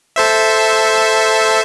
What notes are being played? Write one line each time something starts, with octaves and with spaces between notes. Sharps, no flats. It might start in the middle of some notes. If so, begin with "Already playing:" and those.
A4 C5 E5